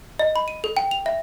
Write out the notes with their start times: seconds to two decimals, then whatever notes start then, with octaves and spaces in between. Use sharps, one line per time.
0.19 D#5
0.36 B5
0.48 D#7
0.64 A4
0.77 G5
0.91 F7
1.06 E5